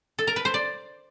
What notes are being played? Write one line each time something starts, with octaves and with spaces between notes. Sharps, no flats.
A4
A#4
B4
C5
D5